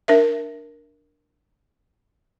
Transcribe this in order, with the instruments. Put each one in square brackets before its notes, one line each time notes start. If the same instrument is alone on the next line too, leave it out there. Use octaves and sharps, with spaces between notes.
[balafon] D4 A#4 E5